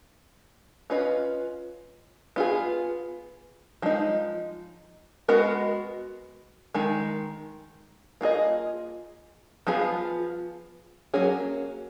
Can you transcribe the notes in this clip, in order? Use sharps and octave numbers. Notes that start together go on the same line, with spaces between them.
C#4 F4 B4 D#5
B3 F4 G#4
F3 G#3 D#4
G#3 B3 F#4 A#4 D#5
D#3 G#3
A#3 F4 G#4 D#5
F3 B3 F4 G#4
F#3 A#3 C#4 G#4